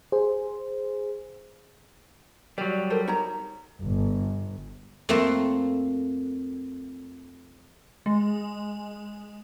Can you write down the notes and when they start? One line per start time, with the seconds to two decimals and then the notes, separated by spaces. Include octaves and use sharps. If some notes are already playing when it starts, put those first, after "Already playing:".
0.12 G#4 C5
2.58 F#3 G3 D5
2.90 A4 A#4 C5
3.07 D#4 C#5 A#5
3.80 G1
5.09 F2 A3 A#3 C6
8.06 G#3